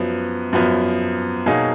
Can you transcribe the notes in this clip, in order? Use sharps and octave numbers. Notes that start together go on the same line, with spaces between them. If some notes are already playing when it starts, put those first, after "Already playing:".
Already playing: F#2 F3 B3
F#2 F3 B3
B2 F#3 A#3 D#4 G#4